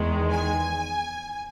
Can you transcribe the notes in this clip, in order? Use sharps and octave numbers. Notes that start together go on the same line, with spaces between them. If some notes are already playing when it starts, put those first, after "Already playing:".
Already playing: E2 D#3 G#3
G#5